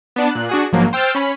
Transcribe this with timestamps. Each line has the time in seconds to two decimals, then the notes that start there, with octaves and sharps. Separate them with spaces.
0.16 B3 D4 A5
0.31 A#2 F#6
0.49 D4 F#4 G#4
0.72 A#1 G#2 F3 F#3 A#3
0.93 C5 G5 E6 F6 G6 A6
1.15 C#4 B5